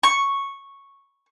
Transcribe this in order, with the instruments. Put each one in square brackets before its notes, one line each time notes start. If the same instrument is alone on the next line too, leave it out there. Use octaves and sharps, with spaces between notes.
[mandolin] C#6